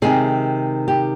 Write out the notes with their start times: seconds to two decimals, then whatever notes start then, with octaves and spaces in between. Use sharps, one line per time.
0.02 C3 D#3 G#3 G#4
0.88 G4